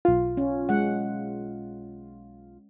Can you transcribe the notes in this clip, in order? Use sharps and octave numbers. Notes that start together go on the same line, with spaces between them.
B1 F4
C#4
G#3 F#5